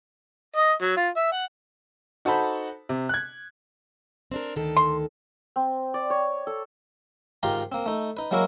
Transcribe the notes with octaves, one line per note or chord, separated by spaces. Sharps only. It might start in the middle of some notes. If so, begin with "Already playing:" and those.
D#5
F#3
F4
E5
F#5
D#4 F#4 A4 C5 A5 B5
C3
F#6 G#6
C4 D4 A#4
D2 D#3 A4
C6
C4
D5
C#5
A4
G#2 D#3 F4 G4 A#5 C6
A#3 C4
A3 D#4
D#4 B4
F#3 G#3 A#3 E4 F#4 A#4